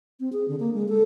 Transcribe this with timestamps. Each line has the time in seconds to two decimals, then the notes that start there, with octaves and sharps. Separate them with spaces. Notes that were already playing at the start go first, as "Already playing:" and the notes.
0.20 C4
0.33 G#4
0.48 D3
0.60 A#3
0.74 G#3
0.89 A4